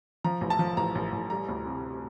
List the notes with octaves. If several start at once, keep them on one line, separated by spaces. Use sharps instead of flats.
F3 A#5
A1
A5
F3
A1 A#5
A1
A1
G3 A#5
D2
C3